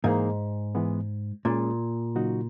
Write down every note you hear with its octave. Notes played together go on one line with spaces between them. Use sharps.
G#2 E3 A#3 D#4 G#4
E3 G#3 B3
A#2 G#3 C#4 G#4
C#3 F#3 A#3 D#4 F#4